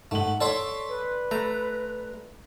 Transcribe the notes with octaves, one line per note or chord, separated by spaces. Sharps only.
G#2 A3 F#5 F#7
A4 C#5 D5 E5 C6 C#6
B4
A3 A#5